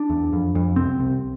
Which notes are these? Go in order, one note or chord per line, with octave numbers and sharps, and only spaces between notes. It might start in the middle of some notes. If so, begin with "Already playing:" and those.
Already playing: D4
E2
F2
F2
C2 C4
C2